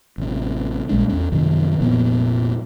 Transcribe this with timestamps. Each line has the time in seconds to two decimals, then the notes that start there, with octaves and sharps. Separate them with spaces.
0.18 A1 C3
0.89 A#1 G3 G#3 D4
1.09 E2 C#4
1.32 F#2 C3 D#3 F3
1.80 F1 A#2 F3 B3